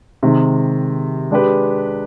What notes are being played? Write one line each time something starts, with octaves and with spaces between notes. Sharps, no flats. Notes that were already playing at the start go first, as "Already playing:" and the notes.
C3 D#3 G#3
G#3 D4 G4 B4